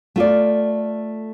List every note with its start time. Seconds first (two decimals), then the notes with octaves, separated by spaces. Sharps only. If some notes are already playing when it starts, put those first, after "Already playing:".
0.16 A3 F4 D5